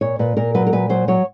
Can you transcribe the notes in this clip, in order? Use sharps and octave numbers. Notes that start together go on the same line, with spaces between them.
A#2 C#5
A#2 B4
A#2 A#4
F#3 B4
A#4
A#2 B4
F#3 C5
F#3 C#5